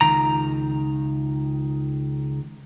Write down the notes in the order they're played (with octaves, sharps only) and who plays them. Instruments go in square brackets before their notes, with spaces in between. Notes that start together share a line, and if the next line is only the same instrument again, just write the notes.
[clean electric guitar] C#2 D#3 A#5